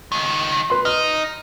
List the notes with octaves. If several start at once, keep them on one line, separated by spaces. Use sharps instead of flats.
C#2 D#3
B4 C6
D#4 F6